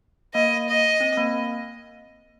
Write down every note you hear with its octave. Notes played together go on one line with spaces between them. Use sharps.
A#3 D#5
D#5
C4
A#3